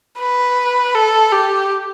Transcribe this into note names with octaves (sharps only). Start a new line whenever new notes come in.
B4
A4
G4